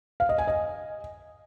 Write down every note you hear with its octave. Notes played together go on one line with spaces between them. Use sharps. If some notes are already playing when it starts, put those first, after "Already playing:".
F5
D#5
G#5
D#5